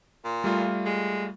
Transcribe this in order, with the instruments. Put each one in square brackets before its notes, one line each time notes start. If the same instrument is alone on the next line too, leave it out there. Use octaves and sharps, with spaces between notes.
[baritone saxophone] A#2
[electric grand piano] G3 A3 F4
[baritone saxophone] G#3